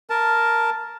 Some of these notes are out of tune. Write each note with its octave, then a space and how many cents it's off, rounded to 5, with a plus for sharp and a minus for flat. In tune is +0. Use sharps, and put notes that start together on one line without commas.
A#4 +0 A5 +0